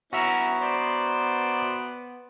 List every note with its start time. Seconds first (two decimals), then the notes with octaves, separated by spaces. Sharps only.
0.13 B3 C#4 E4 F#4 E5 A#5
0.62 C5 D5